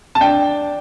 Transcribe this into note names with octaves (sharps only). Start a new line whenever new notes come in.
A5
D4 G5